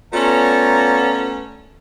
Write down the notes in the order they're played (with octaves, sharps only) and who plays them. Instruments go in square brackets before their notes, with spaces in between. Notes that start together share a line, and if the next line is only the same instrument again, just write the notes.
[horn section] A3 B3 C#4 [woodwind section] F4 D5 A#5